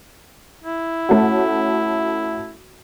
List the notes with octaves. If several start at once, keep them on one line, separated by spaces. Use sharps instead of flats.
E4
A3 C#4 F#4